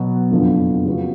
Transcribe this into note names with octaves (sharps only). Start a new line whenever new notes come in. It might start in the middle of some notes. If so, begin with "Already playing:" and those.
Already playing: B2 F#3 B3 F#4 B4
F#1 F2 D3 F3 B3
C#3 F3 B3 F#4